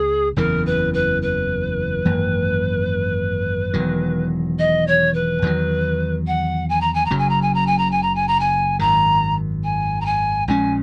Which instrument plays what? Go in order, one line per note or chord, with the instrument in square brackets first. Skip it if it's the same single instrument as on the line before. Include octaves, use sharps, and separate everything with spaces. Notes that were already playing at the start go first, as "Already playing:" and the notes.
Already playing: [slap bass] C#2 C#3 [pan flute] G#4
[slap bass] F#1 E2 C#3 E3 [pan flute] A#4
[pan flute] B4
B4
B4
[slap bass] G#1 F#2 E3 A#3
E1 E2 D#3 F#3
[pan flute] D#5
C#5
B4
[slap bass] E2 D#3 F#3
[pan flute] F#5
G#5
A#5
G#5
A#5
[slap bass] F#1 F#2 C#3 F#3
[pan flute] G#5
A#5
G#5
A#5
G#5
A#5
G#5
A#5
G#5
A#5
G#5
[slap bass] G#1 F#2 D#3 [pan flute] A#5
[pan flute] G#5
A#5
G#5
[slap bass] A#1 A#2 G#3 C#4 [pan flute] G#5